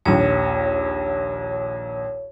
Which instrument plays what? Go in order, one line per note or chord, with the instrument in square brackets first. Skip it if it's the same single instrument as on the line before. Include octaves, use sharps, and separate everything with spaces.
[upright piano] A#1 D#2 [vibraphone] C#5